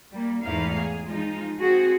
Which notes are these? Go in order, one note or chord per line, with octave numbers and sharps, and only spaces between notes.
G3 A#3
E2 G#2 A3 D#4 E4 F5
G#4
F3 G#3 D#4 F4
C4 F#4 G#4